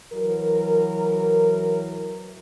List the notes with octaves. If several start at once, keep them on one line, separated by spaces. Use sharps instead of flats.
E3 F#3 A#4